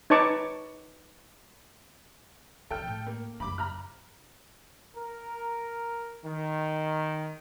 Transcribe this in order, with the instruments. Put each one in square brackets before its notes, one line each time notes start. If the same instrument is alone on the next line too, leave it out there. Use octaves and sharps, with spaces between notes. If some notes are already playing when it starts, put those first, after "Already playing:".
[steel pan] D#4 B4 C#5 A5 C#6 D6
[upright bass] C3 F3 [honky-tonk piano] A4 G5 F6
[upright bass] A2
[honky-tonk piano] A#3
[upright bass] F#2 C#3 [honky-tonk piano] B5 D6
[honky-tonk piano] A#5 B5 F6
[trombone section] A#4
D#3